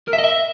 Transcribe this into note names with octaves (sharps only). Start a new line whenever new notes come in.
A#4
E5
D#5
E5